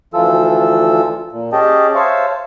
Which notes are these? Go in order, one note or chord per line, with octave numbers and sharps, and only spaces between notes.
D2 E3 F3 F4 A4 E6
A#2
C#4 G4 G#4 D#5 G5 A5
C5 C#5 E5 F5 A5 C#6